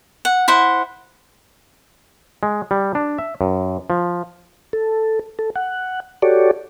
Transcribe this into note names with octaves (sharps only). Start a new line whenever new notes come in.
F#5
E4 C5 F#5
G#3
G3
D4
E5
F#2
F3
A4
A4
F#5
F#4 G4 A4 C#5 D5